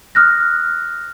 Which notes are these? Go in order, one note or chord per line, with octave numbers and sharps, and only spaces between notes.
D#6 F6 F#6 A#6